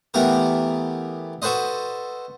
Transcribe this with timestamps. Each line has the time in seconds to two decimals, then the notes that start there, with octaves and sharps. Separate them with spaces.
0.14 E3 A3 B3 G4 A#4
1.42 F#4 A4 B4 C5 D#5